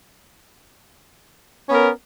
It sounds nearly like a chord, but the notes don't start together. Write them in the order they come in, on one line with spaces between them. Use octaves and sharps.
C#4 B3 A#4